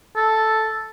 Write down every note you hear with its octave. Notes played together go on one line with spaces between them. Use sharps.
A4